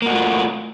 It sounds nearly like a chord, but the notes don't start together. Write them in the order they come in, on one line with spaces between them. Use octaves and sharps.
A#3 F#4 A3 F4